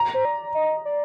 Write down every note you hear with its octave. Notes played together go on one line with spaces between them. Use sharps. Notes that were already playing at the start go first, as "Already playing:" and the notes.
Already playing: A#5
C5
D5
D#5
D5